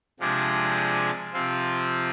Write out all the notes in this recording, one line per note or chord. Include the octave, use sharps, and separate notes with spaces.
C3 F3 G#3 D4 G#4
C3 F3 C4 F4